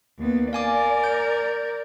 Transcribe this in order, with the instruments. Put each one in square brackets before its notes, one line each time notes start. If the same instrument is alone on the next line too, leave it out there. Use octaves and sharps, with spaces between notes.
[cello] D#2 B3
[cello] A#4 D5 [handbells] F5 G#5 D6
[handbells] G6